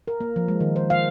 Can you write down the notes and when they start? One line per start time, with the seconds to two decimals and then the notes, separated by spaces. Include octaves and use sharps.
0.08 A#4
0.20 A#3
0.36 F3
0.48 G#3
0.61 D#3
0.76 C5
0.90 F5